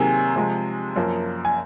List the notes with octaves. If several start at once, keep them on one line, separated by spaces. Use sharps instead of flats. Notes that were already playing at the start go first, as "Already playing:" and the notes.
Already playing: C3 D#3 F#3 A#3 G#4 G#5
C3 F3 G#3
F#2 F3 A#3
G#5